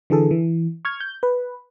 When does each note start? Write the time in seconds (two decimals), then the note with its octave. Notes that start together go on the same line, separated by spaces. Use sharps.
0.10 D3 E3 G#4 A4
0.31 E3
0.85 C#6 F6 G#6
1.00 G6
1.23 B4